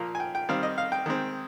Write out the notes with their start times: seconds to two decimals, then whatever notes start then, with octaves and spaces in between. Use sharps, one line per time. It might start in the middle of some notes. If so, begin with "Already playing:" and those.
Already playing: A#2 F3 A#3 F5
0.15 G#5
0.20 G5
0.35 G5
0.49 D#3 G3 C4 F5
0.63 D#5
0.78 F5
0.92 G5
1.06 D#3 G#3 C4